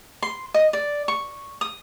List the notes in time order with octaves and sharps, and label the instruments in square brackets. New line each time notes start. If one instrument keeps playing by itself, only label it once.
[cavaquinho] C6
D#5
D5
C#6
D#6